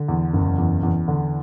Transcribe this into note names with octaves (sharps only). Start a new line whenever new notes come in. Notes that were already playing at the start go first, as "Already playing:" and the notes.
Already playing: D3
E2
F#1
E2
E2
D3